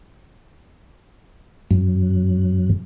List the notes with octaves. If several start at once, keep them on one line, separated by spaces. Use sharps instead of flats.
F#2